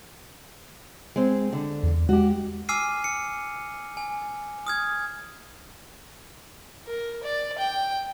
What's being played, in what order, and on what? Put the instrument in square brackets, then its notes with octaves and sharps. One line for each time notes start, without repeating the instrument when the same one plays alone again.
[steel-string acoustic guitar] G#3 C4
D3
[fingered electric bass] E2
[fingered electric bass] G#3 [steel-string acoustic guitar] F#4 G4
[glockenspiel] G#5 D6 E6 F6 C7 D#7
C#7
G#5
D#6 F6 G#6
[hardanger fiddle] A#4
D5
G5